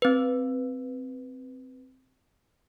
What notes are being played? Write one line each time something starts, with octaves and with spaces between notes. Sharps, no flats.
C4 B4